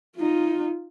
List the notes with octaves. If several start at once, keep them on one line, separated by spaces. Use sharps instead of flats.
D#4 F4